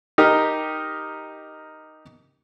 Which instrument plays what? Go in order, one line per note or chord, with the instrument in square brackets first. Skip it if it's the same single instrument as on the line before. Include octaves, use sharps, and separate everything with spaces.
[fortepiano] D#4 G4 A#4